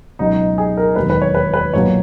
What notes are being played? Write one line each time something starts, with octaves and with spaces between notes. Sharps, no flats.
C#2 B2 F#3 D#4
G#4
A#4
E1 D#2 D#3 F#3 B4
B4
C#5
B4
B4
B1 A#2 F#3 C#5